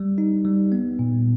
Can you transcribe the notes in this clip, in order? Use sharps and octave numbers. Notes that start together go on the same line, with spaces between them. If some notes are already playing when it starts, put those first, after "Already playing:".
Already playing: G3
D#4
G3
B3
A#2